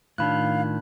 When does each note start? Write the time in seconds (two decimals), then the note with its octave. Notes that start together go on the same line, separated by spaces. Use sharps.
0.18 A2 D#3 D4 F4 F5 B5 F#6